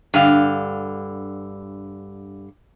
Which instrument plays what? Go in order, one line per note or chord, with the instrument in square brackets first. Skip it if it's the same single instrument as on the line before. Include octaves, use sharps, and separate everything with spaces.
[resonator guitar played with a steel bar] G2 D3 F5